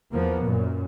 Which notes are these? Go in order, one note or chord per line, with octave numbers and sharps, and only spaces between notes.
E2 F3 A#3 B3
F#2 A#2